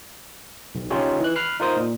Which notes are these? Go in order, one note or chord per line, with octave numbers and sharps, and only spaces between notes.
B1
C#4 D#4 F4 G4 G#4 C#5
E3 F#6
B5 F6 F#6 C7
D#4 F4 A#4 C5 D#6
A#2